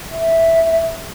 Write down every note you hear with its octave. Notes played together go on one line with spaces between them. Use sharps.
E5